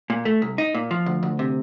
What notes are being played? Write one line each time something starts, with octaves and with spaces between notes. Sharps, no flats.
A#2
A3
C2
D#4
A#2
F3
D2
D2
C3